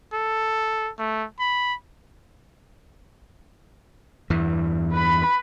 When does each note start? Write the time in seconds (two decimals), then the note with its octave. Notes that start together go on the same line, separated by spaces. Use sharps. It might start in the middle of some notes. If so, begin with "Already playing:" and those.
0.13 A4
0.99 A3
1.39 B5
4.30 E2 G2 E3
4.93 B4 B5